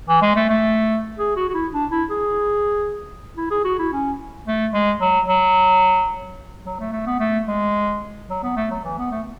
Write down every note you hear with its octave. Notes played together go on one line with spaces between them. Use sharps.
E3
G#3
A3
A3
G#4
F#4
F#4
E4
D4
E4
G#4
E4
G#4
F#4
E4
C#4
A3
G#3
F#3
F#3
F#3
A3
A3
B3
A3
G#3
F#3
B3
A3
F#3
E3
B3
A3